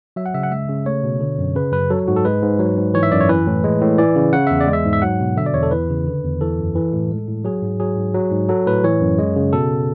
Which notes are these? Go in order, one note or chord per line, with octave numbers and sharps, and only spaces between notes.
F#3 E5
F#5
C#3 E5
F#5
G#3 E5
C#3
A3 C#5
B2
D3
F#2
C#3 B4
F#2 B4
F#3 A4
G#2 F#4
A4
G#3 B4
G#2
F#3
G#2
E3 C#5
E5
F#2 D5
C#5
E3 B4
A2
G#3
A2
E3 D5
C#3
C#3 F#5
E2 E5
D5
G#3
E5
G#2
E5
F#3 F#5
B2
D3 E5
D5
E2 C#5
A4
E3 B4
C#3
D3
E2
E3 A4
F#2
E3
A2
G#3
A2
F#3 G#4
G#2
F#3 G#4
G#2
F#3
G#2
F#3 A4
A2 B4
E3 C#5
F#2
G#3
C#3
B2 A4